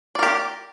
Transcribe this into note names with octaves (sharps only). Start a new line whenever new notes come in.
G4 A#4 D5